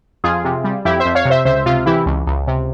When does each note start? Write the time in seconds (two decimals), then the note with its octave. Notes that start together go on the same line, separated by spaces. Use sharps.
0.24 F2 F4 G#4
0.45 C3
0.64 G3
0.85 F2 E4 G4
1.00 C5 E5
1.05 F2
1.15 C#5 F5
1.25 C3
1.30 C5 E5
1.45 C#2 C5 E5
1.66 C3 F4
1.86 E3 E4 G4
2.06 C#2
2.27 C#2
2.47 C3